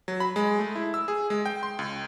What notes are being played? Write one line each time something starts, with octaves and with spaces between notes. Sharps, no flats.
F#3
B5
G#3
A3
E4
E6
G#4
G#3
G5
C6
C#2